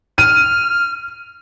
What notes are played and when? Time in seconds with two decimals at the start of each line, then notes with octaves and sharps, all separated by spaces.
0.18 F6 D#7